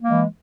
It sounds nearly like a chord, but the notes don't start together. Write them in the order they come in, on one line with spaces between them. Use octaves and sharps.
A#3 G#3 E3